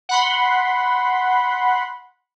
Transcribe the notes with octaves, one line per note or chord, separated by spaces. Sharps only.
F#5 B5 C6